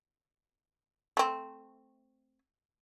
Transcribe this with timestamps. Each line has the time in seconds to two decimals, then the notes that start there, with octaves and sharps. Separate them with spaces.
1.17 A3 C4